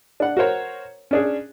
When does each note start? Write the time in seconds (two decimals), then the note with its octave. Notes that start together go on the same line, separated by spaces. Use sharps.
0.20 D4 F#5
0.37 F#4 A#4 C5 C#5
1.11 C#4 D4 G#4